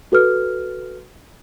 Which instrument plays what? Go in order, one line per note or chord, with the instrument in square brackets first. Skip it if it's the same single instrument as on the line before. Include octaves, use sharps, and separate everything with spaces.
[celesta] F#4 A4 B4 F6